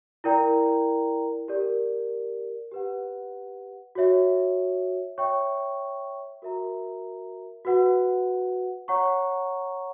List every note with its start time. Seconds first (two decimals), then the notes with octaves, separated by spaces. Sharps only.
0.24 E4 A#4 D5 G5 A#5
1.48 G4 A#4 D5
2.72 G4 B4 F#5
3.95 F#4 C#5 E5
5.18 C#5 E5 G5 C#6
6.42 F#4 A#4 E5 A#5
7.65 F#4 B4 F#5
8.88 C#5 F#5 A#5 C#6